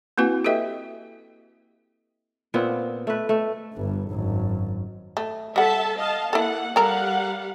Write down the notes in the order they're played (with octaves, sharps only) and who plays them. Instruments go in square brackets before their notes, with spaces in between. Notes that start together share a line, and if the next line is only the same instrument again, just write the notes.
[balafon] A#3 C4 E4 F#4 B4 G#5
G4 A4 B4 D#5 E5 G5
[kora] A#2 B3 C4
A3 B4
A3
[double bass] G1 G2
G#1 F#2
[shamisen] A3
[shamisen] G3 F#5 [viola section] A4 E5 A5
[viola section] D#5 F5 A5
[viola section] A#3 F#5 [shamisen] E4 A4
[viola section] G3 F5 F#5 [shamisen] A4 A#4